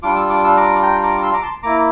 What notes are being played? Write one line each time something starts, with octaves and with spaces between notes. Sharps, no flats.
G3 D4 F4 D6
E6
D6
E6
A#5 D6
G5 A#5
A#5 D6
C6 E6
A#5 D6
A5 C6
A#3 E4 A#5 D6